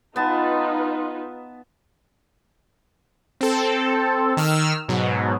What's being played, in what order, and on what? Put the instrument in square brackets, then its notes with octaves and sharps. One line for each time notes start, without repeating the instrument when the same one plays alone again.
[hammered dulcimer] B3 A5 [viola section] D#4 F4 B4
[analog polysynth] C4 A4
D#3 E6 F6
G#2 B2 F#3